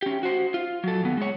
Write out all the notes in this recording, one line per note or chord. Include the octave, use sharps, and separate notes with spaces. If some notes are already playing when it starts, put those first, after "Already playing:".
C#4 G4
F#4 C5
F4
F#3 A4
D#2 B3
G#3 C#5